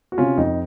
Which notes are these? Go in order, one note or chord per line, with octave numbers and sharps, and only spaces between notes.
F#4
C3 C#4 F4
F2 D#4